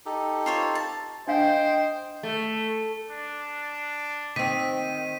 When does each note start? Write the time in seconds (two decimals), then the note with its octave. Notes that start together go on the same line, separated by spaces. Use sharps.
0.06 D#4 G4 A4
0.46 F4 C5 C#5
0.75 A5
1.28 D4 C5 D#5 F5 G5
2.23 A3
3.10 D4
4.36 D#3 C4 B6 D#7